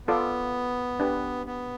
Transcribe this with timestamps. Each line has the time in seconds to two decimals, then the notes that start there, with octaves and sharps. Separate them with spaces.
0.07 B3 F4 A4 D5
1.00 D4 G4 B4
1.46 B3